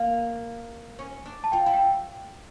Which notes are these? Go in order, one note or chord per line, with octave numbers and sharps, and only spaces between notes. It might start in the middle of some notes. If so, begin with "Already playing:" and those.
Already playing: A#3
C#4
D4
A5
F4 G5
E4
G5